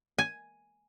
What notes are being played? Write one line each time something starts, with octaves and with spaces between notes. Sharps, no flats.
G#5